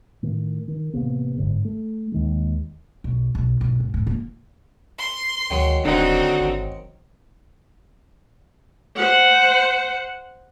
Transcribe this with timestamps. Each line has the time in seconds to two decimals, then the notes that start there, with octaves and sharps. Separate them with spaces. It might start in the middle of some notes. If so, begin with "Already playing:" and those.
0.23 A2 D#3
0.68 D#3
0.93 A1 C3 A#3 B3
1.38 F#1 G#2 D3
1.65 A3
2.12 D#2 D#3 G#3
3.04 B1
3.35 B1
3.61 B1
3.80 G#2
3.94 A2
4.07 A#3
4.98 C6
5.50 D2 D#3 F#3 G#3
5.85 D#1 D3 C4 D4 D#4 F#4
6.40 G1
8.96 C5 F#5